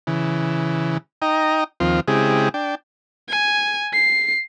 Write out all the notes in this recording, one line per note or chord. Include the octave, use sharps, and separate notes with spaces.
C#3 E3
D#4 D#5 G5 A#5
D#2 F3 C4 F4
C#3 G#3 C4 E4 G4 G#4
D4 G5
G#5
C7